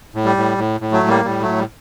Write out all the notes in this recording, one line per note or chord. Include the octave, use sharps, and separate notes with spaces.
A2
G3
A2
A2
A2
F#3 A3
A2
G3 A#3
A2 G3
F#3 A3
A2
G3